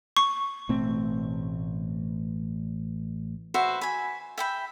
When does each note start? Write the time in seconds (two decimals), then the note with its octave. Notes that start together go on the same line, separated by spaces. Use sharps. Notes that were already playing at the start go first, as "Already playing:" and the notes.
0.17 C#6
0.69 A1 B2 A3 C4
3.54 F#4 B4 C5 E5
3.81 G#5 B5
4.38 E5 G5 B5